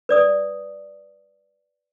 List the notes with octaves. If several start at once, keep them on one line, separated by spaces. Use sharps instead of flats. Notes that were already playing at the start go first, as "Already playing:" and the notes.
B4 D5 D#6